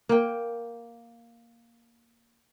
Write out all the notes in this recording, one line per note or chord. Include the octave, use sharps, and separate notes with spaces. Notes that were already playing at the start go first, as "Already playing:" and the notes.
A#3 G5